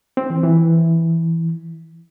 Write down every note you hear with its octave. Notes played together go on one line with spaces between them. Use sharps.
C4
E3
E3